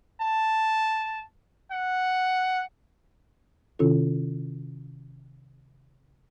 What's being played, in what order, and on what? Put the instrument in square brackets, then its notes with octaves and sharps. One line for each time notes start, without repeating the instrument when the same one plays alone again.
[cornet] A5
F#5
[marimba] C3 D#3 C#4 E4 F4 A4